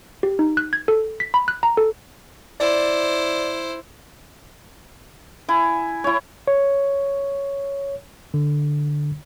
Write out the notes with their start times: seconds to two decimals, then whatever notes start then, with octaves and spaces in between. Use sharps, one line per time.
0.23 G4
0.39 D#4
0.57 F#6
0.73 G#6
0.88 A4
1.20 B6
1.34 B5
1.48 F#6
1.63 A#5
1.77 A4
2.60 E4 C5 D5
5.48 E4 G#5
6.04 E4 C#5
6.48 C#5
8.34 D3